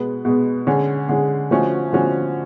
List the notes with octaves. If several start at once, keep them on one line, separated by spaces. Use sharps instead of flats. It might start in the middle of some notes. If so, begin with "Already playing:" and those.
Already playing: B2 G#3 B3
B2 G#3 B3
D3 G#3 C#4
D3 G#3 C#4
D3 F3 A3 C#4 F#4
D3 F3 A3 C#4 F#4